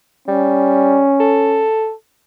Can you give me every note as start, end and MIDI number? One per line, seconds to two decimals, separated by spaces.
0.28 1.05 55
0.28 1.67 61
1.20 1.93 69